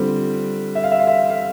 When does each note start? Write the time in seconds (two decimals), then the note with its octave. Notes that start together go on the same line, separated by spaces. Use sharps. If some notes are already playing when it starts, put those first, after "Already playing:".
Already playing: D3 G3 C4 F4
0.75 E5
0.84 F5
0.92 E5
0.99 F5
1.07 E5
1.30 F5